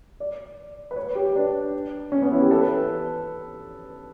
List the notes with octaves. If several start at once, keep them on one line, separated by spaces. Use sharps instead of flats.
D5
B4
C#5
B4
G4
B4
D4
C#4
B3
E4
G4
A4
B4